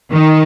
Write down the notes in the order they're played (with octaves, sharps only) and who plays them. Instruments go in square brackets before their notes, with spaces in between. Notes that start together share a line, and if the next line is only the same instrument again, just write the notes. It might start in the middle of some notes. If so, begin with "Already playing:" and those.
[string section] D#3